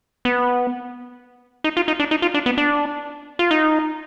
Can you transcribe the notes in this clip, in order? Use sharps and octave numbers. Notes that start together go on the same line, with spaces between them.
B3
D#4
F4
D#4
D4
D#4
F4
D4
B3
D4
F4
D#4